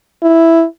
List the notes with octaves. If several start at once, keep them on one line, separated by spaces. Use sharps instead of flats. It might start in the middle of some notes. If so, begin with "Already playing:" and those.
E4